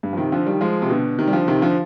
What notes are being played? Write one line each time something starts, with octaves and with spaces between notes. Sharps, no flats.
G2
F3
C3 D#3
D3 F3
D#3 G3
F3 G#3
C3
B2 D3
C3 D#3
G3
D3 F3
C3 D#3
D3 F3